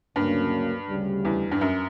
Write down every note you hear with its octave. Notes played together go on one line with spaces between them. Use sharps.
D2 G2 C#3 F#3 A#3 C#4
D2 C#3 G3
E2
G2
F#2